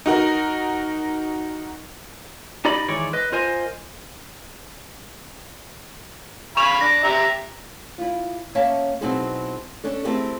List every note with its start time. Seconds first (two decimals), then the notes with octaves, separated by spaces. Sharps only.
0.06 D#4 F#4 A#4
2.65 D#4 G4 D5 D#5 B5
2.88 D#3 E3 G#3 C#5 D5
3.13 B4 D#5
3.32 F4 A#4 C5 D#5 G#5
6.57 F5 G#5 B5 C#6 E7 F7
6.81 D4 A#6
7.04 G4 E5 A#5
7.98 E4 F4
8.55 A#3 C#4 C#5 E5 A5
9.01 B2 F#3 C4 D#4 E4 G#4
9.84 C#4 D4 A4
10.04 A3 C4 E4 G4 G#4 A#4